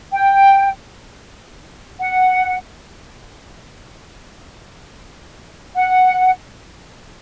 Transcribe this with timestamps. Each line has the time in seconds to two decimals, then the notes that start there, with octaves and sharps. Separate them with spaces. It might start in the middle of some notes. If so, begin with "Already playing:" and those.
0.13 G5
2.00 F#5
5.75 F#5